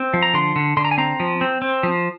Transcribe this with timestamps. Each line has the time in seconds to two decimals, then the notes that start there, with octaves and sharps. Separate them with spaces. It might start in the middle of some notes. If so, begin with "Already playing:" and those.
Already playing: C4
0.14 F3
0.23 A#5
0.34 D3 C6
0.56 D3
0.77 D3 C6
0.85 A#5
0.91 G#5
0.98 C4 A#5
1.20 F3
1.41 C4
1.62 C4
1.83 F3